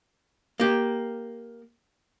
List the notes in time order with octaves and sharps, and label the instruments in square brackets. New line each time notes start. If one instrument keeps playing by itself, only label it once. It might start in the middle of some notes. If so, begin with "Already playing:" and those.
[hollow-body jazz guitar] A#3 G4